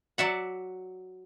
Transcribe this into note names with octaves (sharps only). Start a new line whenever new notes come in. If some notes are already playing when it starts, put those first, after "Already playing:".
F#3 D5 E5 F#5